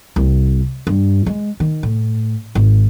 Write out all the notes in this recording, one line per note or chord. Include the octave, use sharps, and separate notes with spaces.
C2
G2
G#3
D#3
A2
G#1